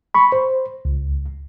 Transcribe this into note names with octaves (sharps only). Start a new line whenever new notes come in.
B5 C#6
C5
C#2